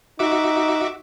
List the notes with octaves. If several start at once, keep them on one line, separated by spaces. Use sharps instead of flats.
D#4 F#4 E5 D6